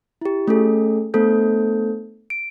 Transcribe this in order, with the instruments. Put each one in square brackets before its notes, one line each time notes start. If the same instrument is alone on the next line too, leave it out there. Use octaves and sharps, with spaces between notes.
[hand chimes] E4 G4
A3 C#4 G#4 A4
A3 B3 D4 A4 C5 G6
D7